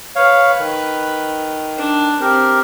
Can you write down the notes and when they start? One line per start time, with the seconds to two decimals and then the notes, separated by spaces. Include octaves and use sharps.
0.16 B4 C#5 F5
0.59 D#3
1.77 D4
2.21 C4 G4 A#4